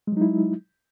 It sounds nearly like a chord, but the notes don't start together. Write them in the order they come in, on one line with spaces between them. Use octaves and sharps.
G#3 F#3 D#4 E4